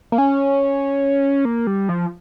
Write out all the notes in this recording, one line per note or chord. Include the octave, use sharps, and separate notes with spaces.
A#3
C#4
A#3
G3
F3